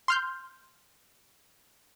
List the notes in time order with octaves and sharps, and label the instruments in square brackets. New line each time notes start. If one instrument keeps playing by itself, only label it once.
[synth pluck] C6 F6 G6